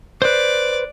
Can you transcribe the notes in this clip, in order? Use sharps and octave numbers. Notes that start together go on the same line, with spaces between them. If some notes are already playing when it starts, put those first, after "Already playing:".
B4 C5 D5